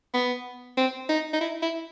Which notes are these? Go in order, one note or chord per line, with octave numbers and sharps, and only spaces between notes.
B3
C4
D#4
D#4
E4
E4